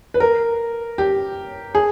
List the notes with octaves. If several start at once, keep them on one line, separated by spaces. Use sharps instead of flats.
B4
A#4
G4
G#4